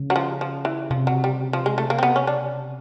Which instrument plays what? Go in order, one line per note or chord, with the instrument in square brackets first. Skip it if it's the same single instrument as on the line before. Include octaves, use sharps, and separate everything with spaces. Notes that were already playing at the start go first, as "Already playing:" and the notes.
Already playing: [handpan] C#3
[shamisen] F#3
F3
F3
E3
[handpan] C3 [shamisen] F3
[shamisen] F#3
G3
F3
G#3
A3
A#3
C4
B3
C#4
D4